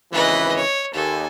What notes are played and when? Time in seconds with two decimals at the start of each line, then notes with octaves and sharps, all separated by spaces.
0.12 G#1 C#3 E3 B4 D#5
0.56 C#5
0.93 D#2 A4 G#5